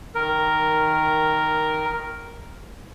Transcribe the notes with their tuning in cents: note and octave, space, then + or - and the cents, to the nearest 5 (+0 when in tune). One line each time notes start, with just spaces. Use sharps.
D#3 +5 A#4 +0